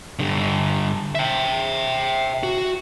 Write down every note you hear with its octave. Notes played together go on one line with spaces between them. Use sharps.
G2 D3
E5 G5
F#4